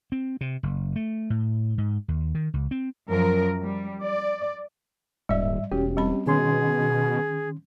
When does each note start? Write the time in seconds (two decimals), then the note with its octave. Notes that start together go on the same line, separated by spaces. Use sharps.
0.12 C4
0.41 C3
0.63 F#1
0.96 A3
1.30 A2
1.78 G#2
2.08 D#2
2.35 D#3
2.54 C#2
2.71 C4
3.08 F#2 F3 A#4
3.62 G3
4.02 D5
5.29 D#1 G#2 G3 D5 E5
5.72 E1 C#4 F#4 G4
5.97 G3 C4 B5
6.26 B2 D#3 C#4 G#4 C6